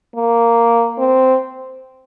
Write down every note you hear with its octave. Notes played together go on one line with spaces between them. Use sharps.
A#3
C4